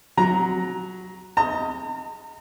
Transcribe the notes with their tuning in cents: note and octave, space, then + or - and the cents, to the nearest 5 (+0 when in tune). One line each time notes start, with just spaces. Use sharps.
F#3 +0 A#5 +5
D#5 +15 A#5 -40